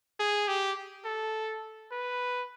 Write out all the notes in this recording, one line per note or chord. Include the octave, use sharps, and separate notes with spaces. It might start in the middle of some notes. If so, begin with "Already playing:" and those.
G#4
G4
A4
B4